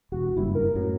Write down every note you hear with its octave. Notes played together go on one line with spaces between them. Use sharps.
E1 F#4
F#1 G2 E4
A#4
F#2 A2 F#3